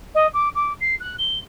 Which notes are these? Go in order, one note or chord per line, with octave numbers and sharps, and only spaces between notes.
D#5
D6
D6
C7
F#6
G7